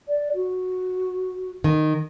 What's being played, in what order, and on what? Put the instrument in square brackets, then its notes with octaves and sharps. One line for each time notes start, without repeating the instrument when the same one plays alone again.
[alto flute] D5
F#4
[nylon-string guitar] D#3